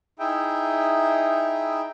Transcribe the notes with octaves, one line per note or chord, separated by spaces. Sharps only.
D#4 E4 G#4 E5 G5